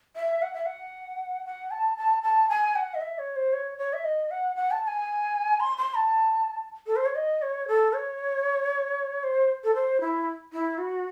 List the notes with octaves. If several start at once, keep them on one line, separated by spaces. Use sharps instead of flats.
E5
F#5
E5
F#5
F#5
A5
A5
A5
G#5
F#5
D#5
E5
C#5
C5
C#5
C#5
E5
D#5
F#5
F#5
A5
A5
G#5
C6
C6
A5
A4
C5
C#5
D#5
C#5
A4
C#5
C5
A4
C5
E4
E4
F#4